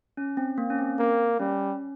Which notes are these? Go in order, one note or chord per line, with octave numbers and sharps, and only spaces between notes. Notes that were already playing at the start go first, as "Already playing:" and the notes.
C#4
C4
A#3
C#4
C4
A#3
G3 C#4